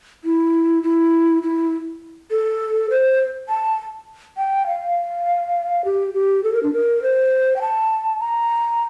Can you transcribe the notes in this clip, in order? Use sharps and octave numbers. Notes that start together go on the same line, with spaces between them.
E4
E4
E4
A4
C5
A5
G5
F5
G4
G4
A4
A#4
D4
A#4
C5
G5
A5
A#5